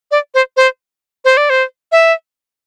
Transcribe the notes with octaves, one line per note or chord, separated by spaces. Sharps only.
D5
C5
C5
C5
D5
C5
E5